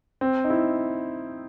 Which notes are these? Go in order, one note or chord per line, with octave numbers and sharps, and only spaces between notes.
C4
D#4
E4